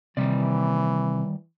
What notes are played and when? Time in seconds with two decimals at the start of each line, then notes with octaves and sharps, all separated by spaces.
0.17 C3 D#3 E3 G3 D5